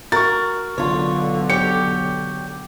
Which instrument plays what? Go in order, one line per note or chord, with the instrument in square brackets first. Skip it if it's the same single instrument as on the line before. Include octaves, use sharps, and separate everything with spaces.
[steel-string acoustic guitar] F#4 [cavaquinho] A#4 [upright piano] C#6 A6
[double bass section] B1 D3 [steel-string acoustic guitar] F4 C#5
[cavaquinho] G4 [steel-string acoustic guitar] C#5 G5 [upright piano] C#7